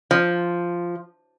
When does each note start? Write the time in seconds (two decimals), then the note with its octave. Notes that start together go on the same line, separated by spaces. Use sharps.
0.11 F3